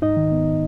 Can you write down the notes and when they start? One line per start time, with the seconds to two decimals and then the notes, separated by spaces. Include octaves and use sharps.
0.02 G#2 D#4 D#5
0.17 D#3
0.32 B3